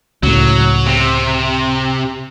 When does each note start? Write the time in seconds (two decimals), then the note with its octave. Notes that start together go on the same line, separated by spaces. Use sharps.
0.23 C#2 A2 F#3
0.86 C3